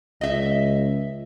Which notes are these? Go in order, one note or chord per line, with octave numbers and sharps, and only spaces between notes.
C#2 D#5 E5